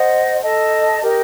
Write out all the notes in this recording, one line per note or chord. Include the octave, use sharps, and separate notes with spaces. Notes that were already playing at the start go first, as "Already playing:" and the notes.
Already playing: C5 D#5 F#5
A4 D#5 A5
G4 A#4 D#5